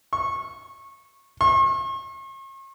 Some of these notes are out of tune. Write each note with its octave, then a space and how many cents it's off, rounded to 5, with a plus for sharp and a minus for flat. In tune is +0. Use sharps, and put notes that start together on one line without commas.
C#6 -20
C#6 -45